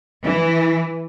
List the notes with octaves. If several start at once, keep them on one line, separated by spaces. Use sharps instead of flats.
E3